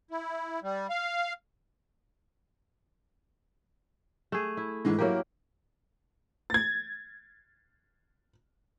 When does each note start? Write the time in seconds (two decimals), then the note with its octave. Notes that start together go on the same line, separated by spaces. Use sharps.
0.11 E4
0.63 G3
0.90 F5
4.32 A3 G#4
4.57 E4
4.85 G#2 E3 G#3
4.99 F#3 A#3 E4 G4 A#4
6.50 G#6 A6